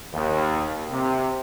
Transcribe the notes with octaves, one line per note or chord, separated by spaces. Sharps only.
D#2
C3